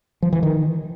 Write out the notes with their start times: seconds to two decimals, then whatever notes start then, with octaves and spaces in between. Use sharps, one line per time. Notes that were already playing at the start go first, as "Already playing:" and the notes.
0.22 F3
0.33 E3
0.43 D#3